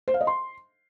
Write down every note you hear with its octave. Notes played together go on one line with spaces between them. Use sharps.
C5
F5
D#5
C6